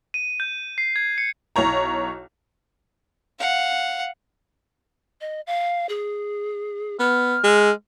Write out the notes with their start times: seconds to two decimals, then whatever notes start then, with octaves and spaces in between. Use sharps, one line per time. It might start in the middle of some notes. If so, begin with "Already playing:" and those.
0.14 D#7
0.40 G6
0.78 C7
0.96 G#6
1.18 C#7
1.56 B1 E4 C#5 A#5
3.39 F5 F#5
5.21 D#5
5.47 F5
5.89 G#4
7.00 B3 F6
7.44 G#3